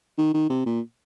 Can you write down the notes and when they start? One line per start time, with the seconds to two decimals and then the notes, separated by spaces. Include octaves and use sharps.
0.18 D#3
0.34 D#3
0.49 C3
0.66 A#2